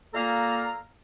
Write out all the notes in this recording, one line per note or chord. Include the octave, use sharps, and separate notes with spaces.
A#2 A#3 A4 F5 A#5